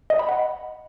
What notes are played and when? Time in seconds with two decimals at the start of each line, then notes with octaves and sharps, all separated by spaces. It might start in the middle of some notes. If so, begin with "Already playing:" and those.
0.10 D#5
0.19 B5
0.29 F#5